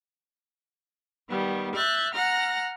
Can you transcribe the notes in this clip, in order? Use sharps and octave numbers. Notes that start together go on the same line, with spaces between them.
D#3 G3 B3
E5 F#6 G6 A6
F#5 A#5 F6 A#6